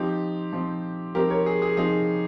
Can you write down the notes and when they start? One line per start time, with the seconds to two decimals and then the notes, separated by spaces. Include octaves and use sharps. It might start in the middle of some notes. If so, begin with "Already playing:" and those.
Already playing: F3 C4 D#4 G4
0.53 F3 C4 D#4
1.15 F3 C4 D#4 G4 A#4
1.30 A#4 C#5
1.46 G#4
1.62 G#4
1.77 F3 C4 D#4 G#4